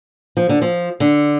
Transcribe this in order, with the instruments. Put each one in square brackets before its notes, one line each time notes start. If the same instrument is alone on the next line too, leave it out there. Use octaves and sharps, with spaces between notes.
[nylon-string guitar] F3
D3
F3
D3